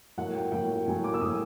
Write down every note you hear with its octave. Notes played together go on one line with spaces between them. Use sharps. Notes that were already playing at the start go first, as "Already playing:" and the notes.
A2 F#3 A#3 F#5
G5
A2 F#3 A#3 G5
A2 F#3 A#3 G#5
D6
E6
A2 F#3 A#3 D#6